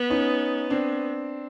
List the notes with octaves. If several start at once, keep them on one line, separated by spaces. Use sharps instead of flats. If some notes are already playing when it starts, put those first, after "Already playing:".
Already playing: B3
C#4 D#4
C4 D4